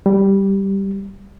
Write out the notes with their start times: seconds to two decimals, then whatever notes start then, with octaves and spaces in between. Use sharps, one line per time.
0.06 G3